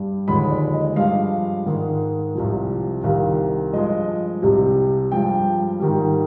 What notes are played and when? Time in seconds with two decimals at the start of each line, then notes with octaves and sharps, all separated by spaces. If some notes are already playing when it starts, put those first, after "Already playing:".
Already playing: G2 G3
0.28 D#2 D3 F3 G#3 B5
0.50 D5
0.74 D#5
0.96 G2 F3 G#3 F5
1.66 G#2 D#3 G#3
2.35 C2 C3 F3
3.04 C2 C3 D#3 F5
3.73 G2 F3 G#3 D#5
4.42 C2 C3 G3
5.12 G2 F3 G#3 G5
5.80 G#2 D#3 G3